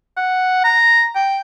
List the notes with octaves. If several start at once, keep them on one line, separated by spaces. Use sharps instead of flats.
F#5
A#5
G5